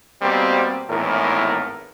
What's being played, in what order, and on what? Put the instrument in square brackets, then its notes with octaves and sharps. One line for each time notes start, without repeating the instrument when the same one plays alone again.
[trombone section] B2 G3 A#3 C4
G#1 E2 A2 A#4